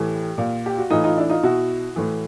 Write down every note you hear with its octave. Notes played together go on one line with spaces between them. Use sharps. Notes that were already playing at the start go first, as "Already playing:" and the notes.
Already playing: A2 E3 G4
A#2
G4
F#4
A2 E3 D#4 F4
D#4 F4
D4 E4
D#4 F4
B2 E4 F#4
A2 E3